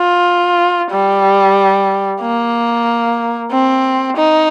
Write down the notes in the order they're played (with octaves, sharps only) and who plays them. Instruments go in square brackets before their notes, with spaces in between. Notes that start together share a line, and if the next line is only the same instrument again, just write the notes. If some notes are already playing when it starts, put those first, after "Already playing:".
Already playing: [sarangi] F4
G3
A#3
C4
D#4